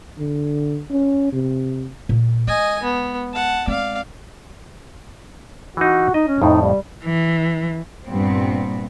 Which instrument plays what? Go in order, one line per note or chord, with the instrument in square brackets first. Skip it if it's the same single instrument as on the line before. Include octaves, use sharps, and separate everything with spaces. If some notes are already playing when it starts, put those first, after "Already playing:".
[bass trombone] D3
C#4
C3
[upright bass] A#2
[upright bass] G#3 [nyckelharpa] D#5 G#5
[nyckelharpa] B3
F#5 A5
[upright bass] G#3 C4 [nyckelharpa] D5 F5
[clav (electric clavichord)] E3 D#4 [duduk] F#4
[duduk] D#4 [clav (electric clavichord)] D#5
[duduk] C#4
[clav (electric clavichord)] F2 A2 [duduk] D#4
[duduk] G3
[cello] E3
[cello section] G2 A#2 B3 C4